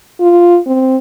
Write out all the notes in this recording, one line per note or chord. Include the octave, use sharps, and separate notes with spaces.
F4
C4